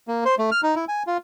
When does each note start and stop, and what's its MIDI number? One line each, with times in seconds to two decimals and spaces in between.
0.08 0.24 58
0.25 0.35 72
0.39 0.50 57
0.52 0.61 89
0.63 0.75 63
0.75 0.85 64
0.88 1.03 80
1.07 1.17 65